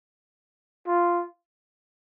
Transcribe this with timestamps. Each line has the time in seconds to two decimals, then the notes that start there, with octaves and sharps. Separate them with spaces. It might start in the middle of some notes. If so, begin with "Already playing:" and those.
0.87 F4